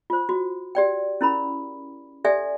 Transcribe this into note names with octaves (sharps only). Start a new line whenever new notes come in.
F4 C5
F#4
G4 D5 G5
C#4 E4 A#4 B5
G4 A4 D5 E5 G#5